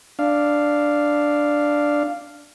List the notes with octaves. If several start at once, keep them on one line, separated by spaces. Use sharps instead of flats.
D4 F5